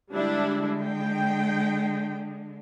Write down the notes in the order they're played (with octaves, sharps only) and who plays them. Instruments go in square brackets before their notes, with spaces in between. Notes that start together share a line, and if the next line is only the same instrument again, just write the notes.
[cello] D3 G#3 [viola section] G3 D4 E4
[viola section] G5